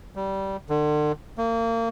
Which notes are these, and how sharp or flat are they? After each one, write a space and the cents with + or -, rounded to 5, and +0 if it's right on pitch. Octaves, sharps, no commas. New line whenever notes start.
G3 -15
D3 +40
A#3 -30